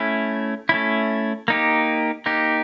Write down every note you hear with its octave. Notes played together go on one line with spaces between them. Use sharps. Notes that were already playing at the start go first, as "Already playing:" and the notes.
Already playing: A3 C#4 E4
A3 C#4 E4
A#3 D#4 G4
A#3 D#4 G4